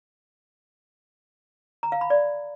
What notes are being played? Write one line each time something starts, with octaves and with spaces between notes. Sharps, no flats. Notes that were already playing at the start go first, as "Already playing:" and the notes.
A#5
F5
B5
D5